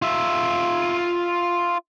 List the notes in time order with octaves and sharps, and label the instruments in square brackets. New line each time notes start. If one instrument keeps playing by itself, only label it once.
[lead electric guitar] F4 E5